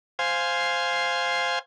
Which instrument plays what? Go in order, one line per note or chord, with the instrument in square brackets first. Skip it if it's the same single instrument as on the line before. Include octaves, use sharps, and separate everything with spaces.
[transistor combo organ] C5 F5 G#5